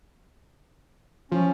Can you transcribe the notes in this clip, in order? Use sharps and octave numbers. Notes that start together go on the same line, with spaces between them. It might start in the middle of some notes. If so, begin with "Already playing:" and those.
F3 C#4